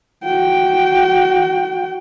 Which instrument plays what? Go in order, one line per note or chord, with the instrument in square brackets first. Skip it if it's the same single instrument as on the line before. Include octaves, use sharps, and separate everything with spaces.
[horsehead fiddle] F#4 G5